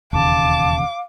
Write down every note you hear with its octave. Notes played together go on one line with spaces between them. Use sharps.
E1 D#2 C#3 F5 A5 D6